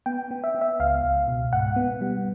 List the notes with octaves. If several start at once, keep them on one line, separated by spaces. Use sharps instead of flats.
B3 G5
B3
E5
B3
E5
C#2 F5
C#2
B2
G#2 F#5
B3
G3